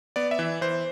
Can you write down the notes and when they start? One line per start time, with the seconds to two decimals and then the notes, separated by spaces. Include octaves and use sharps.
0.16 B3 D5
0.31 E5
0.39 E3
0.61 E3 C5